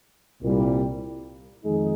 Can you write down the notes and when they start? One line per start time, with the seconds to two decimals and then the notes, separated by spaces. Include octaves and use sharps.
0.42 C2 A#2 G3
1.63 F2 D#3 G#3 D#4 G#4